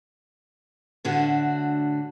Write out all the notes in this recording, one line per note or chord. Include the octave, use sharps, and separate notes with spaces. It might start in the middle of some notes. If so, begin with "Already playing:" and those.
A2 D3 D4 F#4